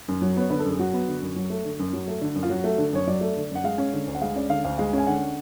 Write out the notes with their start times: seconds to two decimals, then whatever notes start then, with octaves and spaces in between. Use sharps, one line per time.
0.08 F#2
0.22 F#3
0.37 B3 C#5
0.50 D3 B4
0.59 A4
0.65 F#2 G#4
0.79 F#3 F#4
0.94 B3
1.08 D3
1.22 F#2
1.36 F#3
1.50 A3
1.65 D3
1.80 F#2
1.93 F#3
2.08 A3
2.21 D3
2.35 F#2
2.43 F4
2.50 F#3 F#4
2.64 A3
2.78 D3
2.93 F#2 C#5
3.07 F#3 D5
3.21 A3
3.36 D3
3.51 F#2 F#5
3.64 G#3 F5
3.78 C#4
3.93 D3
4.08 D2
4.15 F#5
4.21 G#3 F5
4.36 C#4 D5
4.49 D3 F5
4.64 D2 F5
4.78 G#3 F5
4.93 C#4 G#5
5.07 D3 F#5